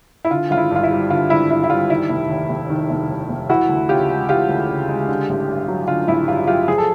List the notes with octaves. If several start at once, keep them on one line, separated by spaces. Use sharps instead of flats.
E4
D3 F4
G#1 F4
E4
G2 F4
E4
G3
D3 F4
G#1 E4
G2 E4
E4
G3 F4
D#3 E4
F1
D#2
F1
D#3
F1
D#2
F1
E3 E4 F#4
D2
C#3 F4 G4
G#3
E3 F4 G4
D2
C#3
G#3
D3
A1
G2
F#3
D3 F4
A1 E4
G2 F4
F#3 F4 G4
F3 G#4
A4